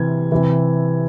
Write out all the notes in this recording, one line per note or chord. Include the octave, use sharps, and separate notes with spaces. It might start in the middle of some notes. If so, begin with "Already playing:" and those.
Already playing: C3 E3 G#6
C3 E3